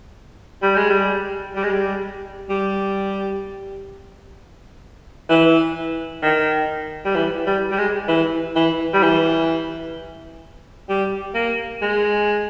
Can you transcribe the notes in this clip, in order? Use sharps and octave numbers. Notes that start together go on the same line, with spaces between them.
G3
G#3
G3
G3
G#3
G3
G3
E3
D#3
G3
E3
G3
G3
G#3
E3
E3
G3
E3
G3
A#3
G#3